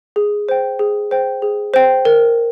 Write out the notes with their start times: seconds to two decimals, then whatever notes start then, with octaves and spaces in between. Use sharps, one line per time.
0.16 G#4
0.49 C5 G5
0.79 G#4
1.11 C5 G5
1.42 G#4
1.74 C5 G5
2.05 A#4